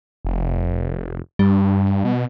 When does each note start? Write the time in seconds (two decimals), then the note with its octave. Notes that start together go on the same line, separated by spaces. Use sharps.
0.25 F1
1.39 G2 G3
2.05 B2